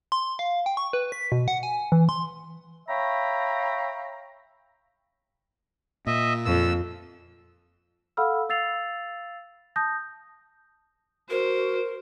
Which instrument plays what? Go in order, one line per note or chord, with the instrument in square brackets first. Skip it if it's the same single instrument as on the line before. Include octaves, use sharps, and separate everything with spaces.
[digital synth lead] C6
F5
G5
C#6
B4
B6
B2
F#5
G#5
E3
C6
[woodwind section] C#5 E5 F5 G5 A#5 B5
[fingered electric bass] A#2 [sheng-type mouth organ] D#5 E5
[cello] F2 [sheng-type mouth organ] E6
[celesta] A4 F5 F#5 B5 E6 F6
F5 E6 A6 C7 F7
A5 D#6 G6 A#6
[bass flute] F#4 [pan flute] A#4 [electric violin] C5